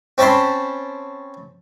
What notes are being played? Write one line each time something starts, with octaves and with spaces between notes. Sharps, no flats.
C4 C#4 A5 B5 C6